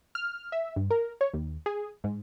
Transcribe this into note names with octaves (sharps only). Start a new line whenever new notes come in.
F6
E5
G2
A#4
C#5
D#2
G#4
G#2